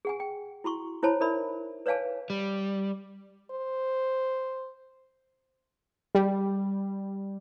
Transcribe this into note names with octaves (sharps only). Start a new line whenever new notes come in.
G#4 F#5 G#5
G5
E4 F#4 C6 C#6
E4 C5 C#5 A5 B5
D#4 A#4 C5 D5 E5 B5
B4 C#5 D5 F5 G#5 A5
G3
C5
G3